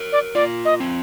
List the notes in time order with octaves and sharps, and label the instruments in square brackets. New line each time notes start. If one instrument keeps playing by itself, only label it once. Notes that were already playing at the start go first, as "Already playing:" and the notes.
Already playing: [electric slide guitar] A#4 C#5
[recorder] D5
[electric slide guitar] F4 [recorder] D5
[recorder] D#5
[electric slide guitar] C4